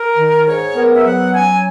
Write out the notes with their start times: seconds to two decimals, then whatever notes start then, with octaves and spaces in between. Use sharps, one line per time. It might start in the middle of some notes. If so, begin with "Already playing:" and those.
Already playing: A#4
0.18 D#3
0.47 G#2 C#5
0.76 B3 A#4
0.95 E5
1.05 F#3 F#5
1.34 C#4 G#5